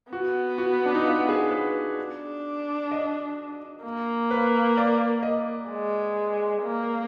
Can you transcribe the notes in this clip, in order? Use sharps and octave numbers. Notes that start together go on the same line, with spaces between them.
B3 F#4
F#4
D4
D#4
F4
G#4
B4
D4
D#5
A#3
B4
D5
D#5
G#3
A#3